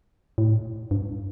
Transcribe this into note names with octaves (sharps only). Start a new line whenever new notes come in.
A2
G2